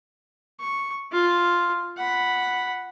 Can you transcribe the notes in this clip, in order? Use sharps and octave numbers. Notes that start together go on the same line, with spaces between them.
C#6
F4
F#5 B5